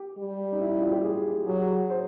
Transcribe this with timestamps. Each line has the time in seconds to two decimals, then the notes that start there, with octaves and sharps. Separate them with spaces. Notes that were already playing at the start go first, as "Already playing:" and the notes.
Already playing: G4
0.18 G3
0.52 D#4
0.61 E4
0.71 E4
0.82 F4
0.92 G4
1.04 G#4
1.47 F#3 G#4
1.90 C5